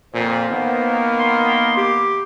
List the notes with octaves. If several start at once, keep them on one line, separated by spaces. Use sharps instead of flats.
F2 A#2 C5
D#3 A#3 B3
C6
G4